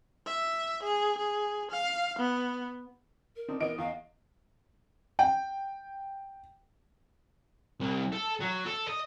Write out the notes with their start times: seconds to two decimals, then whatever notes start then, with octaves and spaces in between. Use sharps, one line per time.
0.26 E5
0.83 G#4
1.18 G#4
1.71 F5
2.19 B3
3.36 A#4
3.48 C4 D4 D#4
3.60 E3 B3 A#4 D#5 D7
3.78 E2 F5
5.19 G5
7.80 C2
8.12 A4
8.41 F#3
8.66 A4
8.88 D#5